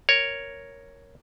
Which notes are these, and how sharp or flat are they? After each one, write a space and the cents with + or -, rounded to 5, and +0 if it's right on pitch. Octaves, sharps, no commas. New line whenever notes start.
A#4 +0 C#5 +0